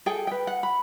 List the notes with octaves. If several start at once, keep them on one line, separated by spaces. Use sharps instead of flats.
G#4 A4 G5
B4 G5
F#5
B5